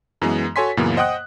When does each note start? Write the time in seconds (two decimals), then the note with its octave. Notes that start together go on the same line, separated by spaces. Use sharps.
0.22 F#2 E3 G#3 B3
0.56 F#4 A4 C#5 G#5 C6 B6
0.77 F#2 A#2 C#3 E3 A#3 B3
0.96 C5 D#5 F#5 G5 D#6 F#6